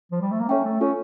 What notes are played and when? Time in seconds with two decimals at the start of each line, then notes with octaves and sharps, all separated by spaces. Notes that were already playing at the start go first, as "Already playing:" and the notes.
0.12 F3
0.21 G3
0.31 A3
0.40 A#3
0.49 C#4 A4 C#5 E5 G5
0.65 A3
0.80 C#4 F4 A4 C#5